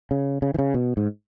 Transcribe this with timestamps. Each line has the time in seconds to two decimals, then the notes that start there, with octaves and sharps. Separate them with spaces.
0.11 C#3
0.42 C#3
0.54 E3
0.59 C#3
0.74 B2
0.97 G#2